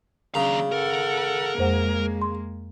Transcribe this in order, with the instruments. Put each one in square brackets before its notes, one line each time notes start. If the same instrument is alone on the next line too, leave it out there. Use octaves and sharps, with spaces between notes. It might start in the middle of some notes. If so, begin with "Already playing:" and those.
[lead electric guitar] D#2 A#5 [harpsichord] C#3 [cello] F#3 D4
[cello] A4 F#5 [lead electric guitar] A#4
[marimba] F2 C5 F#5 [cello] G#3 A#3
[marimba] C6